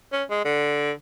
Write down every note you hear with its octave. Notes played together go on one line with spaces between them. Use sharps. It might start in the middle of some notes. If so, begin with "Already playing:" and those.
C#4
G#3
D3